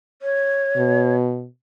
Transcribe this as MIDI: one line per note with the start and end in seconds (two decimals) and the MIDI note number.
0.22 1.13 73
0.77 1.46 47